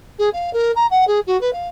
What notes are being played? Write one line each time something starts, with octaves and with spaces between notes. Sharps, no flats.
G#4
F5
A#4
A#5
F#5
G#4
F#4
B4
F5